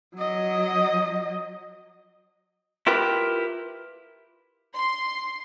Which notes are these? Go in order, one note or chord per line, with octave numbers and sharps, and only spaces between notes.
F#3 D#5
E4 F4 G4 A#4 B4
C6